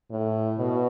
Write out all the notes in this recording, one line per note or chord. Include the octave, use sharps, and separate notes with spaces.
A2
B2